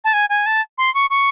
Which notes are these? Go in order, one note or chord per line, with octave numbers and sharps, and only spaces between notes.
A5
G#5
G#5
A5
C6
C#6
C#6